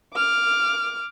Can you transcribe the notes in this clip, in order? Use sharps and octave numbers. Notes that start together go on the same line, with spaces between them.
D6 F6